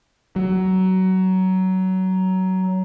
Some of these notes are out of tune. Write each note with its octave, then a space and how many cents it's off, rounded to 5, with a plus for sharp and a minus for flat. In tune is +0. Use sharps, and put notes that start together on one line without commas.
F#3 +20